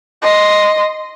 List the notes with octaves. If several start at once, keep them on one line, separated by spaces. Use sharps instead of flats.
D#5 C6